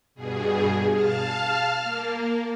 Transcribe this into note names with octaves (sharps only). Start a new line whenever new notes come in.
G2 B2 G#4
F5 A5 F6
A#3